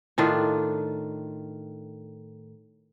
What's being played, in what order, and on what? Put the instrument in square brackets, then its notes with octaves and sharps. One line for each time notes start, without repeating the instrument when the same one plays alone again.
[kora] A2 D#3 D4 F4